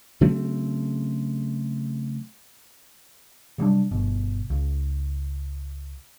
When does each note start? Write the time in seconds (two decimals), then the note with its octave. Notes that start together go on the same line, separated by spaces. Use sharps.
0.21 C#3 F#3 A3 C4
3.58 C3 F#3 G3 D4
3.91 G1 B2
4.50 C#2